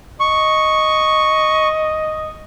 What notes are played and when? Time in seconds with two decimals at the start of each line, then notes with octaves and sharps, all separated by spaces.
0.20 D#5 C#6